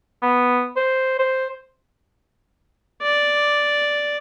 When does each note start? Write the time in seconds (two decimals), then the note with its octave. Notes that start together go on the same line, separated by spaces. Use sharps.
0.23 B3
0.77 C5
1.19 C5
3.02 D5